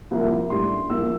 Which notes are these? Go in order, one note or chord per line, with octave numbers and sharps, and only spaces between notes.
C2 A#2 F3 A#3 E4
A2 G3 D4 C6
A#1 A#2 F3 A#3 E4 E6